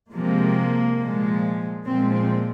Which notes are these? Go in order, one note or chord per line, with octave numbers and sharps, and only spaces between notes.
C3 F3 G#3 A#3
A#2 F3 G#3
A#2 F3 G#3 C4
C4